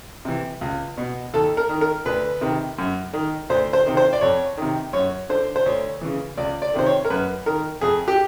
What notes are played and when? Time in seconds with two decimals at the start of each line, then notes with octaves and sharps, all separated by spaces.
0.25 C3 E3
0.61 C#2
0.98 B2
1.34 D#2 A4
1.57 A#4
1.69 D#3
1.81 A#4
2.06 D2 B4
2.41 C3 D#3
2.78 F#2
3.13 D#3
3.50 D2 C5
3.73 C5
3.86 C3 D#3
3.97 C5
4.13 D5
4.21 F2 C#5
4.58 C3 D#3
4.93 F#2 C#5
5.29 D3 C5
5.56 C5
5.66 D2 C#5
6.01 C#3 E3
6.37 C#2 D5
6.62 D5
6.74 C3 D#3 C5
6.87 C#5
7.05 A#4
7.10 F#2 B4
7.46 D#3 A#4
7.81 F2 G#4
8.08 G4